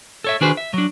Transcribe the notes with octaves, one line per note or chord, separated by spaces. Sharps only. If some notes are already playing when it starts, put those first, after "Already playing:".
A4 C#5 E5
D#3 D4 F#4 G#4 B4 C5
E5
F#3 D4